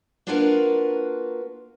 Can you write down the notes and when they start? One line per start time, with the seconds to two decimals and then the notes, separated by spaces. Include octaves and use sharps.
0.27 A#3 D4 F4 F#4 A#4 B4